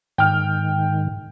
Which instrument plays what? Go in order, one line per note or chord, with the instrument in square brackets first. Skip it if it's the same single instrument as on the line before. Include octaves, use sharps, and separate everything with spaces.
[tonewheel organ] G#2 D#3 [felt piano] G5 F6